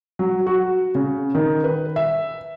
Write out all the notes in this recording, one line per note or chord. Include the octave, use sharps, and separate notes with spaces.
F#3
F#4
C#3
D#3
B4
E5